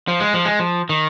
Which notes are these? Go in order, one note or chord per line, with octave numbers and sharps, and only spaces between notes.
F3
G#3
F3
G#3
F3
D#3